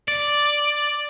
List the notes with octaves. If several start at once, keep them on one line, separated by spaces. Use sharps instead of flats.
D5